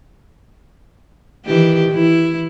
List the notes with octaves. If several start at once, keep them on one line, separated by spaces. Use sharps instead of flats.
D#3 E3 G4
E3 E4